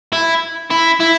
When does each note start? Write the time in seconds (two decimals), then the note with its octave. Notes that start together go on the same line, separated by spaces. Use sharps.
0.13 E4
0.70 E4
1.00 E4